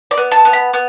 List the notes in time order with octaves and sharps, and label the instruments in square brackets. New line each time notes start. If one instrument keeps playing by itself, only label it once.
[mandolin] D5
B3
A5
B3
B5
B3